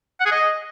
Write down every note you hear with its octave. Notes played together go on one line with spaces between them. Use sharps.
F#5
G#4
D#5